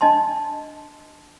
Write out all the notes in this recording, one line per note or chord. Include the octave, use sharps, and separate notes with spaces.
D4 D#5 A5 C6